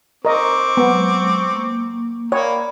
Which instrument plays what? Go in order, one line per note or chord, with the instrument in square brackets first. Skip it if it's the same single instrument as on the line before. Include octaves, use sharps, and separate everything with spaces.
[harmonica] C4 C#6 D6 [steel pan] A#4 D#5
[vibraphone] F#3 G#3 [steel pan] B3
[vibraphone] A#3
[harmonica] A#3 [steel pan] C#5 [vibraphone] D5 B5